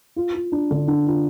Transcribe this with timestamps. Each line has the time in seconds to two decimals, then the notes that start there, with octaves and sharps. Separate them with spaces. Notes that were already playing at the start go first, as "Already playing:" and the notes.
0.16 F4
0.34 F4
0.52 D4
0.71 D3
0.88 D4
1.07 F4